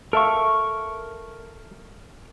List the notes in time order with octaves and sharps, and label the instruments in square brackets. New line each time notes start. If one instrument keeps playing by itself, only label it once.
[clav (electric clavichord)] A4 E5 F5 [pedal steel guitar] A#4 C#6